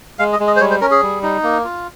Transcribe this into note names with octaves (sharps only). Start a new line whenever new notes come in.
G#3 F5
D#5
G#3
D#5
C5
G3 C#5
C5
C#4 A#4
G#4
G3
D#4
A#3
F4